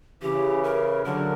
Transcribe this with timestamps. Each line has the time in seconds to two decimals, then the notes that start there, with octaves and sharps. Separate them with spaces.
0.22 C#3 E3 G4
0.63 A#4
1.05 D3 F#3 A#4